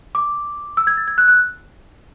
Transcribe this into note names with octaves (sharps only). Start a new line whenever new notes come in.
D6
E6
G#6
A6
G#6
F#6
F#6